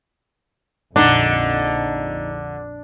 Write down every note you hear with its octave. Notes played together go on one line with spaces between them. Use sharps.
A#1 F2 D3 D4 D#4